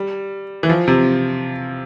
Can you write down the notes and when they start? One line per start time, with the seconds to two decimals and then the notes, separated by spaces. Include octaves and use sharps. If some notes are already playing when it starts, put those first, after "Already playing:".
Already playing: G3
0.63 E3
0.69 F3
0.88 C3